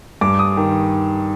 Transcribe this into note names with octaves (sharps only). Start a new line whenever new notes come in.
G2 D6
D#6
D#3